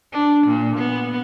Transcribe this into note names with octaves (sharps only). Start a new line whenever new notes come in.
D4
A#2
B3